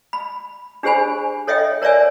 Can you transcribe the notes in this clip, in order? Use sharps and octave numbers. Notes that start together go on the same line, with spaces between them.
B5
D4 G4 G#4 C5 G#5 B5
A4 C#5 D#5 E5 G5
A#4 C#5 D5 E5 G#5